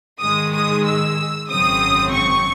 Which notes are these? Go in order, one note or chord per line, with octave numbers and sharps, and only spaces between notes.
G#2 D#3 G#3 D#6
D#6
E6
G#1 F#2 C#3 F#3 C4 D#6
C#6